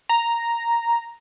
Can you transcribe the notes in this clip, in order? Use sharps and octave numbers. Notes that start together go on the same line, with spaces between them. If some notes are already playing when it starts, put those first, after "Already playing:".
A#5